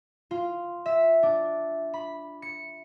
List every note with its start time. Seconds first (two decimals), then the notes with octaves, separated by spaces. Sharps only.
0.31 F4
0.86 E5
1.23 D4
1.94 B5
2.42 C#7